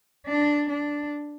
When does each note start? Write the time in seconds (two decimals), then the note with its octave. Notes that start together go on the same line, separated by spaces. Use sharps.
0.27 D4
0.69 D4